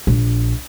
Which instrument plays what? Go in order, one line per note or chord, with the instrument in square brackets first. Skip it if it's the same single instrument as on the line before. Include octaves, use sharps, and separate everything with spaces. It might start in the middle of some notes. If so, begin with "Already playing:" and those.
[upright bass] A#1